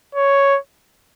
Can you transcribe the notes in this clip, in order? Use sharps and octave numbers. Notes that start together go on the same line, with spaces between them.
C#5